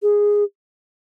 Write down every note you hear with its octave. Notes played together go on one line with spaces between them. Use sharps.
G#4